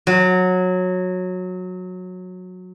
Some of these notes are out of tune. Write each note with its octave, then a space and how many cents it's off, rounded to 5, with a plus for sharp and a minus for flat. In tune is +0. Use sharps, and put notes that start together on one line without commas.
F#3 -15